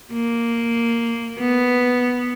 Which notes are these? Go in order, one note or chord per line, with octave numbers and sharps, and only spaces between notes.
A#3
B3